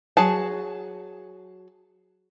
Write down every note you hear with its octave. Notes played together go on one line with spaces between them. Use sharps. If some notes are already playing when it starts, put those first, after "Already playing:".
F#3 G#4 A5